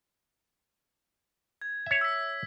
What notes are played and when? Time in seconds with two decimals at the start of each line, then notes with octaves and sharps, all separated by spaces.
1.61 G#6
1.86 C#5 E5
2.01 E6 B6